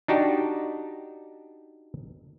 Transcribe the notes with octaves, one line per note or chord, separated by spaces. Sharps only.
D4 D#4 F#4 G4 A5